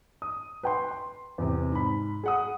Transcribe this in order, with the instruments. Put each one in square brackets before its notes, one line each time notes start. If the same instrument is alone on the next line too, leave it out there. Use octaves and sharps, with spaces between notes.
[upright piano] D#6
B4 G5 C6
C6
E2 C3
G#2 B5
G#4 F#5 D#6